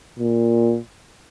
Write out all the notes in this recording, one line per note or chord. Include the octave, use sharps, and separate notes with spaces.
A#2